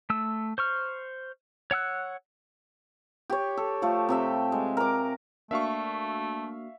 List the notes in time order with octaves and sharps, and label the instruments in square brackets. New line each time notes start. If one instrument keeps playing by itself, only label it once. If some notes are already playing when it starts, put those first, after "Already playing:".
[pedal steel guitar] A3 E6
C5 C#6 F6
C#5 F#5 E6 F#6
[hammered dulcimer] G4 C#5
A4
F3 A3
C3 G4 E5
G#3
A#4 D6
[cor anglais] A3 [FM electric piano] A#3 D4 F#4 [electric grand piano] E5 F5 C#6